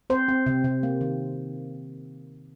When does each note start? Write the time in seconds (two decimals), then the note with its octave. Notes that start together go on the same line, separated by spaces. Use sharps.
0.10 C4 C5
0.29 C4
0.46 C3
0.64 C3
0.83 A#3
1.01 D#3